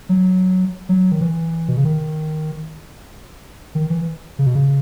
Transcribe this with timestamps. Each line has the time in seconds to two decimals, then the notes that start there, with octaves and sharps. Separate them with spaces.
0.09 F#3
0.89 F#3
1.12 D#3
1.21 E3
1.68 B2
1.77 C#3
1.85 D#3
3.75 D#3
3.90 E3
4.39 C#3
4.46 B2
4.55 C#3